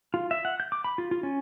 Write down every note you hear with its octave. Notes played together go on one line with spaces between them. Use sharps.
F4
E5
F#5
G6
D6
B5
F4
F4
C#4